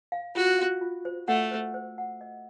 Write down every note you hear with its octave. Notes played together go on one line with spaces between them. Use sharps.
F5
F4 F#4
F5
F4
C5
A3 F#5
C5
C5
F#5
D#5